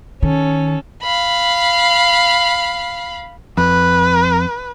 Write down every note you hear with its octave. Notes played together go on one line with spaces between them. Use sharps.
D#3 C#4 A4
F5 B5
F2 B4